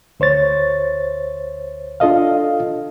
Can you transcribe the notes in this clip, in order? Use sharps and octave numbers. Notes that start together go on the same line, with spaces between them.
D2 C5 C#5 A6
D4 F4 A4 D#5 F5